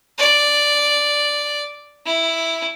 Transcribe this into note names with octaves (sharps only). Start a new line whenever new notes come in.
D5
E4